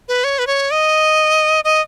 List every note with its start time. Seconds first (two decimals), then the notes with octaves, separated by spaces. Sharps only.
0.08 B4
0.24 C#5
0.39 B4
0.47 C#5
0.71 D#5
1.64 D#5